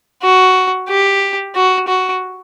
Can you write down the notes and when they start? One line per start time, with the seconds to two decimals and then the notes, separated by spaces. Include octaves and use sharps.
0.23 F#4
0.89 G4
1.55 F#4
1.88 F#4